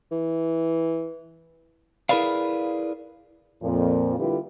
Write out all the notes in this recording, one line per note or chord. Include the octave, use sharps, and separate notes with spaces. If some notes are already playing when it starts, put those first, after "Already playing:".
E3
E4 G#4 A#4 B4 D5 F5
F2 A#2 F3
D3 G3 E4 F4 G4 B4